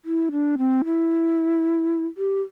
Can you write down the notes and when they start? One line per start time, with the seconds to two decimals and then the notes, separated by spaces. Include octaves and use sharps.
0.05 E4
0.32 D4
0.58 C4
0.85 E4
2.17 G4